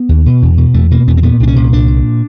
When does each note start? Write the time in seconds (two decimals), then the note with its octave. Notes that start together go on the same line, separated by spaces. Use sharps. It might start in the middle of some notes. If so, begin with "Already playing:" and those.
Already playing: B3
0.09 D#2
0.26 B2
0.42 E2
0.58 B2
0.74 E2 A3
0.91 B2 A#3
1.07 E2 B3
1.17 C4
1.23 A#2 B3
1.40 C2 D4
1.47 C#4
1.56 A#2
1.73 C2 D4
1.88 A#2